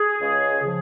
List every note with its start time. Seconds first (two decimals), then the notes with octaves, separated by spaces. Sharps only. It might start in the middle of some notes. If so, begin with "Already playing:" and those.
Already playing: G#4
0.20 C#2 C#3 G#3 C#4
0.63 C#3 F3